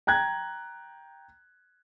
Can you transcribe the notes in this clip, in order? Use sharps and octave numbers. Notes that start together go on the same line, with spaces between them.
G5 A#5 F#6 G#6